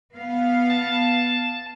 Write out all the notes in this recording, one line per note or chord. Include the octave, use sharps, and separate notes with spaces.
B3 F5
A5